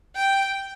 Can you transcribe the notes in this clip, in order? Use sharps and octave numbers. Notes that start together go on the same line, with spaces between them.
G5